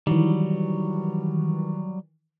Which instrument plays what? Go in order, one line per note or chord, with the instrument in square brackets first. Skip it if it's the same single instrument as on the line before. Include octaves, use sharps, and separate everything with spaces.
[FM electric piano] D#3 E3 [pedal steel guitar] F#3 G3